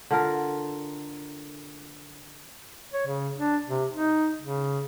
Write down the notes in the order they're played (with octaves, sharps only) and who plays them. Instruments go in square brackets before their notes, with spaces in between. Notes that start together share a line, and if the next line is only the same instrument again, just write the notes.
[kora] D3 F4 A#4
[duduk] C#5
C#3
D4
C3
D#4
C#3